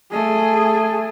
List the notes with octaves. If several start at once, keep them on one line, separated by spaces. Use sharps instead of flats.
A3 G#4